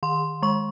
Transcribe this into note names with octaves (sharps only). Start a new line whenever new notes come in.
D#3 C6
G#3 C#6